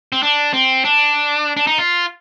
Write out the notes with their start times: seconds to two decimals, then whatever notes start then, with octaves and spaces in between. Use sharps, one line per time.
0.12 C4
0.23 D4
0.53 C4
0.85 D4
1.57 D4
1.67 D#4
1.78 F4